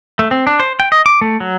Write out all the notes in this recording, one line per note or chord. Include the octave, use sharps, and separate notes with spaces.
A3
C4
D4
C5
G5
D#5
D6
A3
F#3